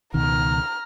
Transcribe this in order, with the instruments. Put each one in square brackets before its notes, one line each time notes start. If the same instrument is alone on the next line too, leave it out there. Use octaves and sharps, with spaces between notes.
[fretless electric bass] C#2 B2 D#3 [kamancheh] A#5 F6